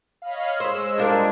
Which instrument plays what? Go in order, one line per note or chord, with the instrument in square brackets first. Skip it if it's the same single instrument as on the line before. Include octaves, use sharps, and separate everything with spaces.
[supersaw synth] C#5 D#5 B5 [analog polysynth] F5
[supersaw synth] G#3 [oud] C5 [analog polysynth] E6
[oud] G3 F4 A#4 [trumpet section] D4